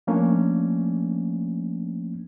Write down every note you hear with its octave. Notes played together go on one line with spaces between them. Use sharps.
F3 A3 A#3 C#4 D4